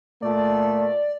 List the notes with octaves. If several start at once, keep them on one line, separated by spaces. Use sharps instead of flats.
A#2 A3 D5